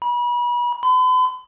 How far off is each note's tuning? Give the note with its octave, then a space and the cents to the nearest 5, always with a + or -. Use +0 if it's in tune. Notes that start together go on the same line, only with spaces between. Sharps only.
B5 -35
B5 +45